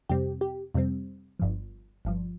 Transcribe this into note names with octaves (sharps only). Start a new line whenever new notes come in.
F2 C3 G3 C4 G4
G4
F2 C3 G3 C4
G1 G2 F3
G1 G2 F3